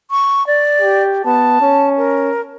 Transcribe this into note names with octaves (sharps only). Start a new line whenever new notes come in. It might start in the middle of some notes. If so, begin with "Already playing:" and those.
C#6
D5
G4
B3 A5
C#4
A#4